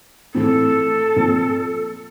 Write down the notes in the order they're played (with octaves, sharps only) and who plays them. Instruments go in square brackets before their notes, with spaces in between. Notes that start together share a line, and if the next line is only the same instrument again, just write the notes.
[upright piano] A2 E3 A3 C4 [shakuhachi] A4
[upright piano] A#2 F3 C4